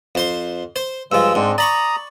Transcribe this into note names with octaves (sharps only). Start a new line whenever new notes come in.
F2 C5 C6
C5
G2 F3 G#3 E6
G#2 G#3 C4 D4
D5 A#5 B5 C#6 D#6